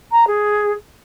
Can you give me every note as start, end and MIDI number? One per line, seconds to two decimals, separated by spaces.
0.12 0.27 82
0.27 0.73 68